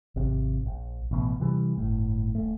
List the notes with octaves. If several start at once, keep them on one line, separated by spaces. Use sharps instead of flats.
G#1 C3
A#1
A1 B2
C3 E3 G3
G1 A2
D#1 A3